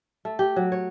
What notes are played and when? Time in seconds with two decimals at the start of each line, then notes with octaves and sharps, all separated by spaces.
0.25 A3
0.39 G4
0.56 F#3
0.72 C#5